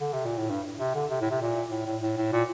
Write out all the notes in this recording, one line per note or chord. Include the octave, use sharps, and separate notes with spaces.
D3
C3
A#2
A2
G2
C3
D3
C3
A2
C3
A#2
A2
A2
A2
A2
A#2